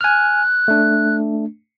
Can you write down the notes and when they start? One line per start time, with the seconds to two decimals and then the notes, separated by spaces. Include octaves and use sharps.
0.01 G#5 F6 F#6
0.68 A3 D4